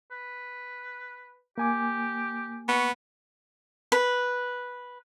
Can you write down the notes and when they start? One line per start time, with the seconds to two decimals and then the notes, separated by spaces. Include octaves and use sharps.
0.11 B4
1.58 A#3 G4 G#5 D6
2.68 B3 C#6
3.92 B4